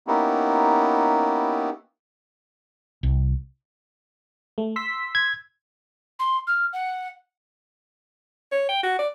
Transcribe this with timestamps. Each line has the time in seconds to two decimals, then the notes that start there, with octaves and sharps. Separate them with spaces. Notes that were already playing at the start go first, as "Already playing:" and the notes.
0.07 A#3 B3 C#4 D#4 E4 G4
3.03 C2
4.58 A3
4.76 C6 E6 B6
5.15 G#6
6.19 C6
6.47 F6
6.73 F#5
8.52 C#5
8.69 G5
8.83 F#4
8.99 D5